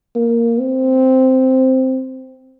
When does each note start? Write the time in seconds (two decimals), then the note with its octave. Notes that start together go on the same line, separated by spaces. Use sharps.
0.16 A#3
0.60 C4